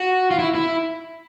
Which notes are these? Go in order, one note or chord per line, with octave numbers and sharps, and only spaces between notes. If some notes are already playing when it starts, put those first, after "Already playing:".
Already playing: F#4
F4
E4
E4